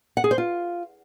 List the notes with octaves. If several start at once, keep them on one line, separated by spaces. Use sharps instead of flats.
F#5
G#4
C5
F4